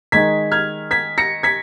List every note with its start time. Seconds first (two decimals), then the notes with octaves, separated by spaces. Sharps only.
0.12 D#3 G#3 D#4 G#6 B6
0.52 F6 G#6
0.91 G#6 B6
1.18 A#6 C#7
1.43 G#6 B6